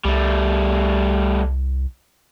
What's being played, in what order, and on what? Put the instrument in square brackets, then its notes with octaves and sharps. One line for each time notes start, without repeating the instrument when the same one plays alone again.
[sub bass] C2 [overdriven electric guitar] G3 A3